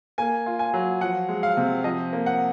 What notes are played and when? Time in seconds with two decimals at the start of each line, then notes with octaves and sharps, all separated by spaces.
0.18 A#3 G#5
0.46 F4
0.59 G#5
0.74 F#3
1.01 F3 F#5
1.29 G#3
1.43 F5
1.57 C3
1.84 F3 D#5
2.13 A#3
2.26 F#5